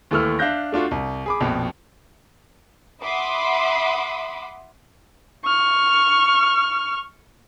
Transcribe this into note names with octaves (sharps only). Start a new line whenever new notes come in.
D#2 E3 A3 E6 F6
D4 E5 F5 F#6 G6 A#6
A3 D4 F4 F#4
C2
G#4 B5 D6
A#1 F2 B2
E5 F#5 B5 C6 D6 D#6
C#6 F6